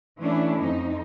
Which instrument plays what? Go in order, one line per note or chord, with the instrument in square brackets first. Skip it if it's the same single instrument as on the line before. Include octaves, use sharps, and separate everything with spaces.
[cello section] E3 A3 C#4 D4 E4
F2 D#4